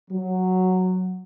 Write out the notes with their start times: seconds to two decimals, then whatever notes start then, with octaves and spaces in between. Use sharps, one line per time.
0.10 F#3